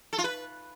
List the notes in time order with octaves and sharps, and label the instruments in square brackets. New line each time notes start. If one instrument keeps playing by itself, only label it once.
[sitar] A4
F4
B4